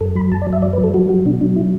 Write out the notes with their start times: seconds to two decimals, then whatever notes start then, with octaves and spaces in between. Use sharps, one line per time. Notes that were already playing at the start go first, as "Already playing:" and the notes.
0.01 F#2 A4
0.15 F#3 B5
0.32 F#2 A5
0.42 D5
0.47 F#3
0.53 E5
0.62 F#2 D5
0.73 B4
0.78 F#3
0.84 A4
0.94 F#3 F#4
1.09 F#3 F#4
1.25 B2 D4
1.41 F#3 D4
1.56 E4